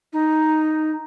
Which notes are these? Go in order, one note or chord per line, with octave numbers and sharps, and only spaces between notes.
D#4